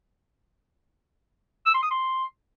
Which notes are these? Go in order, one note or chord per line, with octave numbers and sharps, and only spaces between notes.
E6
C6
D#6
C6